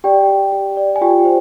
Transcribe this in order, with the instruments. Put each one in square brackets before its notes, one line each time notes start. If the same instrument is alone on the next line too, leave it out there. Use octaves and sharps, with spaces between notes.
[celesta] G4 D5 G5
G4
G4
D5
G#5
F4 G4 G5
C5